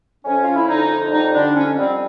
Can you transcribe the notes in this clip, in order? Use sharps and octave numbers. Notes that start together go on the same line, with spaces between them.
F2 C#4
F2 F4
E4
D3 D#4
F2
G3 D#4
D3 D4
F2 C#4
G3 C4